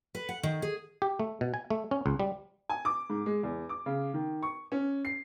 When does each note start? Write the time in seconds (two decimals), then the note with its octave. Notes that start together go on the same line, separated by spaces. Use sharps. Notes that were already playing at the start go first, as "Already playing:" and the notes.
0.15 B4
0.29 F#5
0.43 D#3
0.62 G#4
1.02 G4
1.20 A3
1.41 B2
1.54 G#5
1.70 A3
1.91 C#4
2.06 C#2
2.20 G3
2.69 G#5
2.85 D6
3.10 G#2
3.26 G#3
3.43 E2
3.69 D6
3.86 C#3
4.14 D#3
4.43 C#6
4.72 C#4
5.05 C7